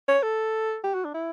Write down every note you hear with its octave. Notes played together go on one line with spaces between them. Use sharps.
C#5
A4
G4
F#4
D4
E4